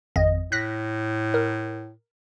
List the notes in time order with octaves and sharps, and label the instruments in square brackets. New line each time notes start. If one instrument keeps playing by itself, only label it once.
[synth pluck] G#1 F2 D#5
[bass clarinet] A2 [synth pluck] F#6 A#6 B6
[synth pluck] A#4